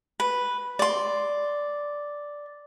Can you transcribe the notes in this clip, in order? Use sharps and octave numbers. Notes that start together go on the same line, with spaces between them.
B4
D5 C6